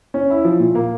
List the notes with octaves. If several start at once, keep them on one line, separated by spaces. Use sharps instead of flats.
C#4
E4
F3
A#2
A#3